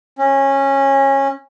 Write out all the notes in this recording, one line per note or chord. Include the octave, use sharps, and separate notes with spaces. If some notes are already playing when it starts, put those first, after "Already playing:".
C#4